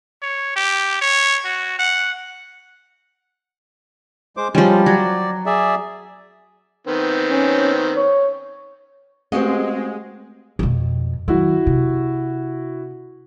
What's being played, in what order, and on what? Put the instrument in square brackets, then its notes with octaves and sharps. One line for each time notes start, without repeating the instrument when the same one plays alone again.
[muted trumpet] C#5
G4
C#5
F#4
F#5
[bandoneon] G#3 C5 D6
[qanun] F3 G3 [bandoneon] G#3 C#4
[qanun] F#3 [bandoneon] D5
[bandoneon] G#4 D5 E5
[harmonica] D#3 B3 C4
[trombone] C#4
C#5
[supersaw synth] G#3 [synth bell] A3 G4 [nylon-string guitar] C4 F#4 D#5
[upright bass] F2 B2
[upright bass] D#3 F#3 [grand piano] E4 F#4
[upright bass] C3